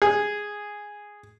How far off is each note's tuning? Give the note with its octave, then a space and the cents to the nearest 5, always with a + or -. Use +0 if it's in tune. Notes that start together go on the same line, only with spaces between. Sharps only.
G#4 -5